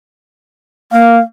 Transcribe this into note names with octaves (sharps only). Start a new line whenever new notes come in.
A#3 F5